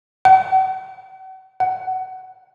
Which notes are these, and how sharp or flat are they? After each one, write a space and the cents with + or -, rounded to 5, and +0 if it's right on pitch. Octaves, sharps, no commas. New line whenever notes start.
F#5 +40
F#5 +15